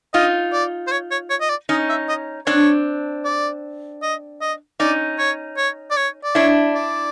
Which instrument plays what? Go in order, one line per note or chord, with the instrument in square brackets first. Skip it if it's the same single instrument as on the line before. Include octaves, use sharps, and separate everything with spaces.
[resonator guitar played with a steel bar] D#4 F4 [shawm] D#5
[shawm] D5
C5
C#5
C#5
C#5
D#5
D5
[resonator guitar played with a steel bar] C#4 D#4 [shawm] D#5
[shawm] E5
D#5
[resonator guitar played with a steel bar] C4 D4 [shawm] C#5
[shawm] D5
D#5
D#5
[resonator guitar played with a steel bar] C#4 D#4 [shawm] D5
[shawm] C#5
C#5
D5
C#5
D5
[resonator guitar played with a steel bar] D4 E4 [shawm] C#5
[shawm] D5